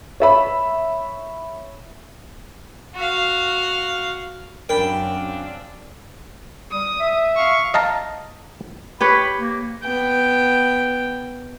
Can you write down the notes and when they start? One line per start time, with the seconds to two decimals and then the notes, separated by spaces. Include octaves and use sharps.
0.20 C#5 E5 B5
2.95 F#4 F5
4.69 F#2 C#3 C4 D4 A#4 G5 B5
6.71 G3 D#6
7.00 E5
7.36 F5 C#6
7.74 D#5 F5 A5 A#5
9.01 G4 B4 C#5 B5
9.38 A#3
9.83 B3 G5